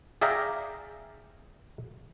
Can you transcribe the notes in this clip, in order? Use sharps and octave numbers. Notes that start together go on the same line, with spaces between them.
G#4 D5 E5 F5 G5 A#5